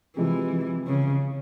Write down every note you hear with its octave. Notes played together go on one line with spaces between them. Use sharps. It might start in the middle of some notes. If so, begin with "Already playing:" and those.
C3 E3 F3 G#3 C4
C#3